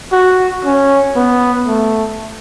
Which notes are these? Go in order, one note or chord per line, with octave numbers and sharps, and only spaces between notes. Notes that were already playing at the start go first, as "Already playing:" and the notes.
F#4
C#4
B3
A3